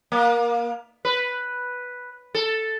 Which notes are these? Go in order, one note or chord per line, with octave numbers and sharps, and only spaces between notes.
A#3
B4
A4